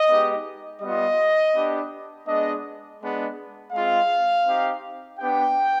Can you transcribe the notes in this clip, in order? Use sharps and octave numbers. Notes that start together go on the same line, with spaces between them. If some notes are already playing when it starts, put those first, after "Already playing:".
Already playing: D#5
G#3 B3 D#4 G4
G3 B3 F4 D#5
B3 D4 G4
G#3 B3 D4 D#5
G#3 B3 D4
G#3 C4 F4 F5
C4 D#4 G4
B3 D4 G4 G5